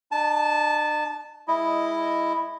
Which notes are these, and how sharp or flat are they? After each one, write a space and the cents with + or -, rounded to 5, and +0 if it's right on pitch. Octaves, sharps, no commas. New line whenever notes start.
D4 +45 A5 -15
G#3 -10 E4 +0 D#5 +0